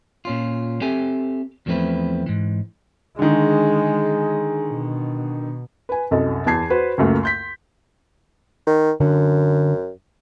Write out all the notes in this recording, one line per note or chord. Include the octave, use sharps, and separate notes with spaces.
A#2 C#4 F4
C4 G4 A4 E5 G#5
E2 F3 A3 C4 E4 B4
G#2 E3
D3 D#3 G#3 G#4
B2
B4 G#5
C2 F#2 A4 D#5
E2 A5 G#6 C7
F#4 B4 C5
C#2 F#2 A3 A#3
C6 G6 B6
D#3
F#2 D3